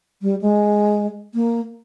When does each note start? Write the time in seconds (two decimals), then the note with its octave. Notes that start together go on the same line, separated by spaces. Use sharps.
0.22 G3
0.41 G#3
1.34 A#3